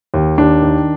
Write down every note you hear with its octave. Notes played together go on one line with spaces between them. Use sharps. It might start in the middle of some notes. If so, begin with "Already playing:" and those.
D#2
D#2 D4
D#3